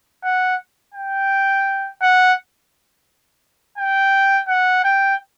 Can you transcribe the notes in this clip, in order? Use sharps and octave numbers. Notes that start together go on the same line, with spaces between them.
F#5
G5
F#5
G5
F#5
G5